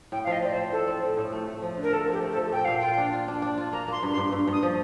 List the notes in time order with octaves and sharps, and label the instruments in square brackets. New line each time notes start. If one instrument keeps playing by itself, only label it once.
[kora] A2 [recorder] G5
[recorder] F5
[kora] F3 [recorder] D#5
[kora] C4 [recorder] D5
[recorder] C5
[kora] C4
[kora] A2 [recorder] A4
[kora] C4
F3
A2
A3
A3
F3
D3
[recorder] A#4
[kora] D3 [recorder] A4
[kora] F3 [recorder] G4
[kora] A3
[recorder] A4
[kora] F3
[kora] A#2 [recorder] G5
[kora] A#2 [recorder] F5
[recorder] G5
[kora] F4
D4
F4
D4
D4
F4
[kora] A#3 [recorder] A#5
[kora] A#3 [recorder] C6
[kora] G2
[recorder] C6
[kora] G2
G2
[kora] G2 [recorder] D#6
[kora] F3